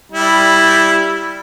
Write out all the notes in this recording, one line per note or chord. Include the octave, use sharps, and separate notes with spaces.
G3 E4